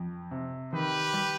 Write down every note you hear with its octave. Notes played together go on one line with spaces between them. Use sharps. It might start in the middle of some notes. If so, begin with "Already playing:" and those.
Already playing: F2
C3
D#3 G4 B4
G3